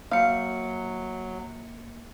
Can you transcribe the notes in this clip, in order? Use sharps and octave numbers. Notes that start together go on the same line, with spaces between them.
F#3 A#3 F5 C#7